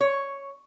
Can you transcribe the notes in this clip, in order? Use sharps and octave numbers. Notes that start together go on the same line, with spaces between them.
C#5